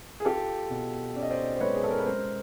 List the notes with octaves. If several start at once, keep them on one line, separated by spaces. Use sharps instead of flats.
G#4
F4 G4 A4
B2
C#4 D5
D#5
C5 D5
C5
G#3 B4 C#5
G#4
A4
A#4
B4
G#3 A#4 C5